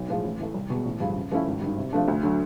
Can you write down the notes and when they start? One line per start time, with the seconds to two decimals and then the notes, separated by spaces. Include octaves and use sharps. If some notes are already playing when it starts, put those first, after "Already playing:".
Already playing: B1
0.09 A2 F3 G#3
0.24 A1
0.39 A2 E3 A3
0.54 C2
0.70 B2 G#3
0.85 A1
1.00 G2 D3 F3 G#3
1.16 C#3
1.32 F3 A3 C#4 E4
1.46 G#1
1.61 G2 D#3
1.77 C3
1.93 F3 A3 D4
2.08 D2
2.23 D3 F#3